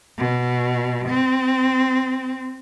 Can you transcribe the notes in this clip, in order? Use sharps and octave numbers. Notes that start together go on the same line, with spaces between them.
B2
C4